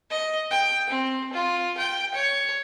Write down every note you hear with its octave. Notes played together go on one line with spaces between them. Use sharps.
D#5
G5
C4
F4
G5
C#5